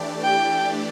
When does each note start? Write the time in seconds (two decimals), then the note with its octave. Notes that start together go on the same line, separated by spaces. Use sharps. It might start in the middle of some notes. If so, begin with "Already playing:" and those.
Already playing: E3 A3 D4 G4 D5
0.23 G5